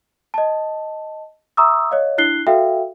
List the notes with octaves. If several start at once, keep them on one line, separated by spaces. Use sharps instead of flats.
D#5 A5
E5 A#5 C#6 D#6 E6
C#5 D#5 F5
D4 E4 F#6 C7 G7
F#4 A4 E5 F5 G5